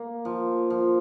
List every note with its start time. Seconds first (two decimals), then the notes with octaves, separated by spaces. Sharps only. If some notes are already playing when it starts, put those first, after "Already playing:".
Already playing: A#3
0.25 F3
0.70 F3